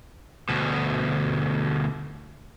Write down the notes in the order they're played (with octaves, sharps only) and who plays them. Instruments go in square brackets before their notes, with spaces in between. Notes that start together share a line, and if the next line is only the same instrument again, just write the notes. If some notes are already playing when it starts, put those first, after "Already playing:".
[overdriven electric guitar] D2 B2